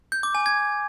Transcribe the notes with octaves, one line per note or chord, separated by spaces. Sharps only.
G6
D6
G#5
G#6